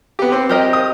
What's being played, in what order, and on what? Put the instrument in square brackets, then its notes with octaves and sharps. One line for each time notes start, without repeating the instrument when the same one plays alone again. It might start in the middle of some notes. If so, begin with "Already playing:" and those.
[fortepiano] B3 G4
C4
[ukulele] G4 A#4 D#5
[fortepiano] D#6